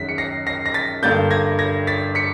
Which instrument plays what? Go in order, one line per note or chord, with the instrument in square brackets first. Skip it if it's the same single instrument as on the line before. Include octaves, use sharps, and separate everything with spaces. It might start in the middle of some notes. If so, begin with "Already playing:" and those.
Already playing: [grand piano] F#2 D#3 G#3 B6
C#7
A#6 C7
A#6 C7
A#6
A6 B6
G2 D3 G3 A#3 G6 A6
G#6 A#6
G#6 A#6
A6 B6
B6 C#7